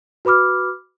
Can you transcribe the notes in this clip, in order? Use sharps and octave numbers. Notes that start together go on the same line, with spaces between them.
F#4 B4 B5 D6 F6